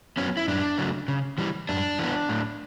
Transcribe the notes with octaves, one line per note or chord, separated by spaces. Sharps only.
F#3 B3 C#4
E4
F#2 D4
C#3 F#3 A3
C#3
E3 G3
F#2 D4
E3 B3
A2